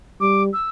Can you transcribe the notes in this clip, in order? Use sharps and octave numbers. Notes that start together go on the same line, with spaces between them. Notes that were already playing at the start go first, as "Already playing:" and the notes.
G3 D6
E6